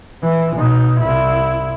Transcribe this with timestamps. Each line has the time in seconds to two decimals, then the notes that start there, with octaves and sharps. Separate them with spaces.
0.23 E3
0.56 B2 D#4
1.00 C2 E4